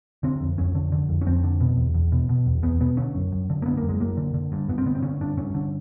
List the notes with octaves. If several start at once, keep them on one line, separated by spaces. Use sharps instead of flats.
D3 C4
F2
F2 C#4
D3
D3
F2
C#4
F2 C4
D3
B2
E2
E2
B2
B2
E2
E2 B3
B2 B3
D3 C#4
F#2
F#2
D3
A#3
D3 B3
A#3
F#2
G#3
F#2 A#3
D3
D3
G2
G2 B3
C4
D3 B3
C4
D3 C#4
G2 D4
G2 C#4
D3